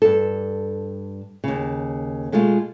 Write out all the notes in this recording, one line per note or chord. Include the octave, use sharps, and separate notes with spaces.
G2 A4
D#2 C#3
B2 G#3 A3 F4